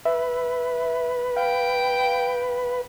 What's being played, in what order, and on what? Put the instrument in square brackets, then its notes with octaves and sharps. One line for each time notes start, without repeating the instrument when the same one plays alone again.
[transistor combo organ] B4 [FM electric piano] E5
[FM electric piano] F5 [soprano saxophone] G5